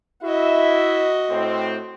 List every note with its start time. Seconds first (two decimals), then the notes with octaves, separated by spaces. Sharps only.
0.23 E4 F#4 D#5 E5
1.30 A2 C4